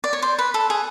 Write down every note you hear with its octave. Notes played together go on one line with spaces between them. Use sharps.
D5
C#5
C5
B4
A4
G#4